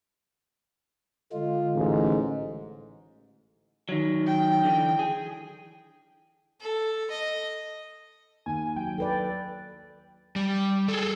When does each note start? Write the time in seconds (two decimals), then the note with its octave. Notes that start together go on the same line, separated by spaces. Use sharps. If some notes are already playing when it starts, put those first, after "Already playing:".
1.33 D3 G#3 F4
1.76 A1 G#2
3.89 D#3 F#3
4.27 G5
4.64 D3 E3
4.99 G#4
6.61 A4
7.10 D#5
8.46 D#2 G#5
8.76 F#3 G5
8.98 A4 B4 D5
10.36 G3
10.88 G#4 A4